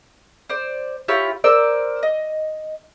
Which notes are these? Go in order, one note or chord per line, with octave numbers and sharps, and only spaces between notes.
C5 D5
E4 F4 G4 C#5
A#4 C5 D5 E6
D#5